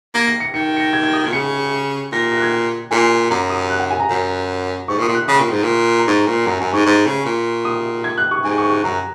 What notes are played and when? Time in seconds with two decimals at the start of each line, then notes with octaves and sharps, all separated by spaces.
0.14 A#3 G#6
0.27 A#6
0.40 C#7
0.54 D#3 C#7
0.76 C#7
0.80 A#6
0.93 G#6
1.03 G#6
1.13 D#6
1.23 G#6
1.26 A#2
1.33 C#3 C#7
2.12 A#2 A#6
2.32 A#6
2.37 F#6
2.42 G#6
2.91 A#2 G#5
3.30 F#2 A#5
3.50 D#6
3.70 F#6
3.80 F#5
3.91 G#5
4.00 A#5
4.10 F#2
4.88 G#2 C#6
4.98 A#2
5.02 D#6
5.08 A#2
5.15 F#6
5.28 C#3 D#6
5.40 A#2
5.51 G#2
5.63 A#2
5.99 A#5
6.08 G#2 C#6
6.27 A#2
6.46 F#2 A#5
6.60 F#2 G#5
6.73 G#2 C#6
6.86 G#2
7.06 C#3
7.26 A#2
7.65 D#6
8.04 G#6
8.18 F#6
8.31 C#6
8.44 G#2 G#5
8.58 C#6
8.70 C#6
8.84 F#2 A#5